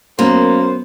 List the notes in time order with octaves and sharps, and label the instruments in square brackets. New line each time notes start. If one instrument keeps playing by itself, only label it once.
[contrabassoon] F#2 [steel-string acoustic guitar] A#3 [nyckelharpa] B3 [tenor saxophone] C5